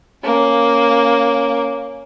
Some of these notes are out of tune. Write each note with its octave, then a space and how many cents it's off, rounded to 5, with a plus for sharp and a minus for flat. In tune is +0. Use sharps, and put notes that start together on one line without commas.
A#3 +0 C#4 +0